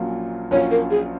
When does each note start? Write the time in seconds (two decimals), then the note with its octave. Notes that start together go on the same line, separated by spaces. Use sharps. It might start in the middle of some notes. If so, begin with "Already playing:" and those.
Already playing: A#1 A#2 F#3 C#4 F4
0.51 A#1 A#2 F#3 C#4 F4 C#5
0.71 A#4
0.91 G#4